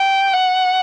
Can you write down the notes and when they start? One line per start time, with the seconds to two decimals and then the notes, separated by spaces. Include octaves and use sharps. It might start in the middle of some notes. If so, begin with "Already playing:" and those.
Already playing: G5
0.34 F#5